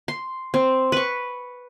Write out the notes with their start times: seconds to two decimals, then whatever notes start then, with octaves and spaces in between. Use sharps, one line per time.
0.08 C6
0.54 C4
0.92 B4 C#6